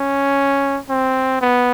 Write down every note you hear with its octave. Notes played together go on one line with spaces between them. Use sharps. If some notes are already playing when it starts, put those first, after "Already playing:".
Already playing: C#4
C4
B3